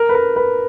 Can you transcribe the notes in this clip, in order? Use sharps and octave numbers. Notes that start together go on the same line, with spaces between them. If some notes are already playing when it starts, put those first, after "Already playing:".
Already playing: A#4
B4
A#4
B4